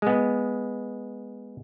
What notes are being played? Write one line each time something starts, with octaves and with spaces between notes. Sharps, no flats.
G#3 B3